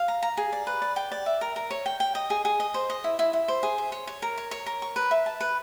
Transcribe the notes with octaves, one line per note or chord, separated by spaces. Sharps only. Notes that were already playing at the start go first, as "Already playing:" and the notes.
Already playing: F5
A#5
A#5
G#4
D5
B4
D5
G5
D5
E5
A#4
A#4
C#5
G5
G5
D#5
G#4
G#4
D#5
C5
D#5
E4
E4
E4
C5
G#4
C5
C#5
C#5
A#4
C#5
C#5
A#4
C#6
B4
E5
A5
B4